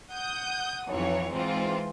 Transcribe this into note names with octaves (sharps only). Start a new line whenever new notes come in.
F#5 D#6 G6
B1 F2 E3 C#5
G#2 E3 G#3 C4 F4